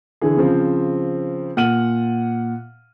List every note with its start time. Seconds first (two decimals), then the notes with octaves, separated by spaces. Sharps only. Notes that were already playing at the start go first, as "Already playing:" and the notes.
0.21 D3 E3 G#4
0.37 C#3 F3 C4
1.57 A#2 F#5 F6 D#7 F#7